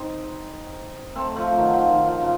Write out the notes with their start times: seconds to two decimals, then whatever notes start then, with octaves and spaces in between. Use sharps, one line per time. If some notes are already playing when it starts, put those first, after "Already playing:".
Already playing: C4 D#4
1.15 A3 C4
1.36 F3 A3
1.57 D#3 F#3
1.73 F3
1.89 D#3
2.06 F3
2.22 C#3